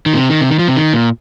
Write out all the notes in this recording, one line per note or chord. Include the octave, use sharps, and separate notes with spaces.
D#3
A#2
C3
D#3
C3
D#3
F3
C3
D#3
A#2